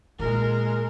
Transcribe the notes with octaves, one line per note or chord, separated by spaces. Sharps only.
A#2 G#3 A#4